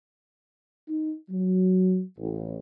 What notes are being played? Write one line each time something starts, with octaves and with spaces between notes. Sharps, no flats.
D#4
F#3
A1